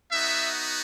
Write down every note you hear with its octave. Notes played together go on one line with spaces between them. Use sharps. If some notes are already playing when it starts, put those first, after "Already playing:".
B3 D#4 F#4 E5